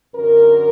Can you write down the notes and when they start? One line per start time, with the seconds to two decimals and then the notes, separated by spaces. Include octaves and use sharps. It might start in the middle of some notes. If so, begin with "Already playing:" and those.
0.16 F#2 D3 A#4